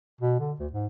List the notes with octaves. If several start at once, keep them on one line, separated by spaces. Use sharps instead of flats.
B2
D3
D2
G#2